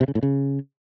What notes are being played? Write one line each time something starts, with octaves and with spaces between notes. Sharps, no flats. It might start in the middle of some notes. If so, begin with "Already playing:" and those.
C3
C#3
A2
C#3